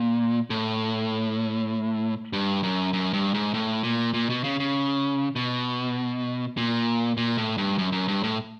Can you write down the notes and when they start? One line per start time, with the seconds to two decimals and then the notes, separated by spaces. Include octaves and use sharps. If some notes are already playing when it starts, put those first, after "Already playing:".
Already playing: A#2
0.50 A2
2.33 G2
2.63 F#2
2.93 F#2
3.13 G2
3.34 G#2
3.54 A2
3.83 A#2
4.14 A#2
4.30 B2
4.44 C#3
4.60 C#3
5.36 B2
6.57 A#2
7.17 A#2
7.37 A2
7.58 G2
7.78 F#2
7.92 F#2
8.08 G2
8.23 A2